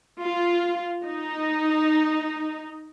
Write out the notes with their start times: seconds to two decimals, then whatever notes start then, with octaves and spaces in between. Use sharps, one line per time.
0.22 F4
1.04 D#4